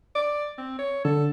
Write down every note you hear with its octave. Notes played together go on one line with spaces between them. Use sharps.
D5
C4
C#5
D3 A4